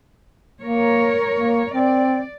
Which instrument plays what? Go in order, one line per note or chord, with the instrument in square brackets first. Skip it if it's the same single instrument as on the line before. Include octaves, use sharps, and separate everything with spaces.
[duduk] A#3 [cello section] A#4 C#5
[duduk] A#3
[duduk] C4 [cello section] D5